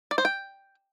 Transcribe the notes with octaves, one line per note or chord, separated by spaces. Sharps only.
D5
C5
G5